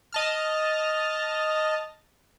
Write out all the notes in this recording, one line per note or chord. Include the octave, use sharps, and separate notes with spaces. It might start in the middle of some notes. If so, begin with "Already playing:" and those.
D#5 A5 F6